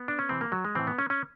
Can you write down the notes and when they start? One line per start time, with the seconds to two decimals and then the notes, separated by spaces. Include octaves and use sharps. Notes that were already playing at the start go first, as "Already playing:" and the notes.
Already playing: B3
0.08 D4
0.19 C#4
0.29 C3 E3 C4
0.41 A#3
0.52 F#3
0.65 G#3
0.75 A2 E3 C4
0.87 B3
0.99 C#4
1.10 C#4